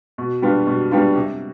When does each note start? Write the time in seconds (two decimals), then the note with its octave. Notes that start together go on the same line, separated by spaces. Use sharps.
0.18 B2
0.42 G3 B3 D4 F4
0.67 B2
0.91 G3 B3 D4 F4
1.15 C3